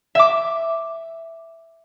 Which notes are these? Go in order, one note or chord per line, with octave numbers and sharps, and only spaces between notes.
E5 D6